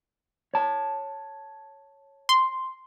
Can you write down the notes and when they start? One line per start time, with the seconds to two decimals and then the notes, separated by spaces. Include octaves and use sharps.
0.54 C#5 A5
2.29 C6